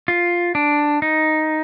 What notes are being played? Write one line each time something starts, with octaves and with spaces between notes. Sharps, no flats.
F4
D4
D#4